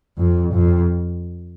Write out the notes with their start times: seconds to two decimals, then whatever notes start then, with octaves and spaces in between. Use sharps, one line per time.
0.18 F2
0.55 F2